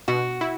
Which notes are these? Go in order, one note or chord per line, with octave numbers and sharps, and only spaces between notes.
B2 F#4
E4